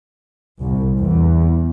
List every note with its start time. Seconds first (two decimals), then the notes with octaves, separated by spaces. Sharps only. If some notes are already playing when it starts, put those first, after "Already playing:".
0.59 C2
0.97 E2